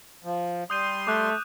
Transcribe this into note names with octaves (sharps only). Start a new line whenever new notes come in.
F3
G3 C6 D#6 G6 D#7
A3 D6 F#6